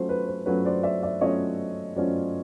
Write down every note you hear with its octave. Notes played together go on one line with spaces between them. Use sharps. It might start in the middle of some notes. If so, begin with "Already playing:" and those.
Already playing: F#3 A3 C#4 F4 C5
B4
C5
F#3 A3 C#4 F4 B4 C#5
C5 D5
D5 E5
D5 E5
F#3 A3 C#4 F4 C#5 D#5
F#3 A3 C#4 F4 C5 D5